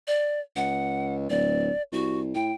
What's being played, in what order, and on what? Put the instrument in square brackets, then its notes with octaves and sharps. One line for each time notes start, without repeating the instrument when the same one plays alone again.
[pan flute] D5
[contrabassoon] C#2 [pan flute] F#5
[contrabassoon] D1 [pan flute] D5
[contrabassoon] C2 [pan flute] F#4
[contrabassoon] A2 [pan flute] G5